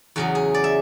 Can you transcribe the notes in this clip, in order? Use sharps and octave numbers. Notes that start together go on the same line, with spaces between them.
E2 C#3 F#3 F#4
G#4
D5
E5